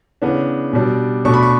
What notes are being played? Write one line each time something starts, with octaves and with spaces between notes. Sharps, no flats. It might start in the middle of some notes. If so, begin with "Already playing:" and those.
C#3 E3 B3 D4
B2 G3 D4
B2 A3 D4 C#6
B5
C#6